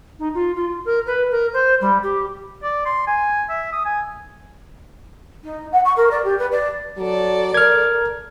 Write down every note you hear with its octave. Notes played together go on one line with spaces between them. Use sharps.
D#4
F4
F4
A#4
B4
A#4
C5
G3
G4
D5
C6
G#5
E5
D#6
G#5
D#4
F#5
C#6
A#4
D5
G4
B4
D5
F#3 A4 D5
A#4 F6 G#6